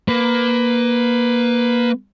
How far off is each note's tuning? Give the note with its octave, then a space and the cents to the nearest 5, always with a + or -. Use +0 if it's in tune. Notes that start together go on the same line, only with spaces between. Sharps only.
A#3 +15 B4 +15